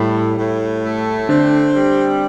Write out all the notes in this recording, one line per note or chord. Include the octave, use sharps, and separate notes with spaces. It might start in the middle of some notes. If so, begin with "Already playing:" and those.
Already playing: A2 G3
A2
A3
D3 C4 D4
G3